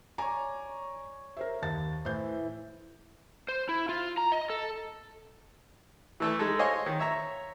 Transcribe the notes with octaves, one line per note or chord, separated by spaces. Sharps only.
C#5 D5 G#5 A#5
A#4 C5 E5
D#2 A5 A6
A2 E3 C5 G6
C5
E4
F4
A#5
D#5
A4
E3 A3 A4
G#3 D#4 A4
C5 C#5 D#5 F5 G#5 C6
D#3
C#5 E5 A#5